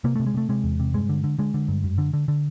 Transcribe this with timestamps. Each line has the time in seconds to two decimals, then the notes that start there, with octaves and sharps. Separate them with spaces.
0.04 C3 A#3
0.15 C3 A3
0.26 G#3
0.34 C3 A3
0.49 C3 G#3
0.64 E2
0.80 C3
0.94 G2 G#3
1.09 D3
1.24 D3
1.39 D3 G#3
1.54 D3
1.68 G2
1.84 F#2
1.98 D3
2.13 D3
2.28 D3